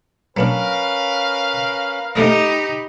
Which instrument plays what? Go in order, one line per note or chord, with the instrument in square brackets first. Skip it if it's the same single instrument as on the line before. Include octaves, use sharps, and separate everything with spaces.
[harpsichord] F#3 B3 D4 [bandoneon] C#4 B5 [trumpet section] A#4 B4 F5
[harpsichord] A3 D#5 [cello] D#4 G4 [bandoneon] B5